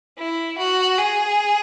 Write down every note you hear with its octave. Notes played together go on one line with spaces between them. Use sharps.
E4
F#4
G#4